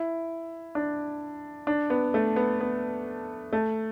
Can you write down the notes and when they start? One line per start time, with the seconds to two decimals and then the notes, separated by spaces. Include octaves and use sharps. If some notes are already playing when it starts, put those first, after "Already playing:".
Already playing: E4
0.75 D4
1.67 D4
1.90 B3
2.14 A3
2.36 B3
2.61 B3
3.53 A3